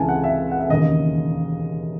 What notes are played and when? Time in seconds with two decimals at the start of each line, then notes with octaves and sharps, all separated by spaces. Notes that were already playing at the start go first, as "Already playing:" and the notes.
Already playing: C#2 C3 E3 G#3 G#5 A5
0.09 F#5
0.24 E5
0.52 F#5
0.60 E5
0.69 E1 D#2 C#3 D#5